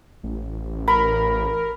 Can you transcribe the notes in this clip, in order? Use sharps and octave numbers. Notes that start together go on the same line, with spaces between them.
A1
A#4 B5